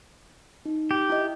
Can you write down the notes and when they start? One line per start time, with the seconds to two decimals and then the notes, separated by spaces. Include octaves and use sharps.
0.66 D#4
0.91 G4
1.10 E4 D#5